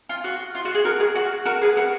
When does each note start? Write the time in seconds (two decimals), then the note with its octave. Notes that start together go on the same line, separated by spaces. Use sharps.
0.09 F4
0.24 F#4
0.55 F4
0.65 F#4
0.75 G#4
0.85 F#4 A#4
1.00 G#4
1.15 F#4
1.45 F#4 A#4
1.62 G#4 B4
1.77 F#4 A#4